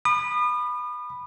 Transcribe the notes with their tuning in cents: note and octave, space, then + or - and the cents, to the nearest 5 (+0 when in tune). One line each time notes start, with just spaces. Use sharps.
B5 +0 D#6 -40